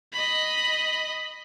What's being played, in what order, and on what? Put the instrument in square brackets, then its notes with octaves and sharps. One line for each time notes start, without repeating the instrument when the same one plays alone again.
[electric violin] D#5 B5